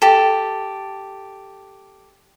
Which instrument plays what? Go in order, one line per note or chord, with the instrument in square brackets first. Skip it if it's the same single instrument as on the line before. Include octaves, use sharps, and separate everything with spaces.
[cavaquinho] G4 A4